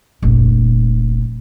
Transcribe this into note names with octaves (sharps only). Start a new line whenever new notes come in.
F1 A#1